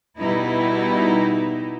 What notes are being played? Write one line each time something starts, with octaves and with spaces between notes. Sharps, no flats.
B2 G3 D#4 E4